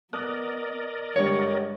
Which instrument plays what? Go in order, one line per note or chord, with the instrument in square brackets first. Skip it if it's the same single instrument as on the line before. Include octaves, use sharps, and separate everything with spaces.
[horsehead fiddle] B3 [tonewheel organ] A#4 D5 D#5 [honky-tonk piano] D6 D#6 F#6
[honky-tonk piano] G2 D3 [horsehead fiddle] G#3 G4 [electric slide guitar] C#5